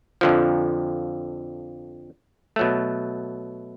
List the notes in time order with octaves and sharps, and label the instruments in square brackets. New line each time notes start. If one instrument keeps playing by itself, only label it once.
[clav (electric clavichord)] F2 D3 F3
B2 F#3 A3